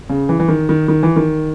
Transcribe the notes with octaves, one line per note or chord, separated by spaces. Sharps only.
C#3
E3
E3
D#3
D#3
D#3
E3
D#3